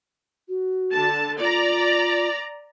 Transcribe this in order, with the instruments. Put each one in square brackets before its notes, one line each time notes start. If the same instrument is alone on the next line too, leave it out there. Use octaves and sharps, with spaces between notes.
[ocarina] F#4
[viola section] D3 A5
[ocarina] F4 [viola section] D5 A#5